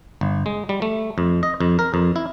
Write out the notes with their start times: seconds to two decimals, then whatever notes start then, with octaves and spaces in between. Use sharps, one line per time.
0.21 G1
0.46 G#3
0.69 G3
0.82 A3
1.18 F2
1.43 D#5
1.61 F2
1.79 A#4
1.94 F2
2.16 E4